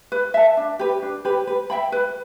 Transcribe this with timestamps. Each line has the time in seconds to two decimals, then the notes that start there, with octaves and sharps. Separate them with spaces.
0.12 B4
0.34 E5 A5
0.57 D4
0.79 G4 B4
1.02 D4
1.25 G4 B4
1.47 B4
1.70 E5 G5 B5
1.92 B4